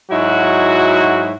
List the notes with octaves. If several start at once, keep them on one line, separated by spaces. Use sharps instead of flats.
G#2 F#3 D#4 E4 F#4